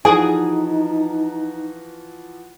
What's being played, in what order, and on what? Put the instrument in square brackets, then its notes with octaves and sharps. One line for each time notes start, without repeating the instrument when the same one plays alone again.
[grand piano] E3 F3 F#4 [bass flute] D#4 [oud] G#4 [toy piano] G#5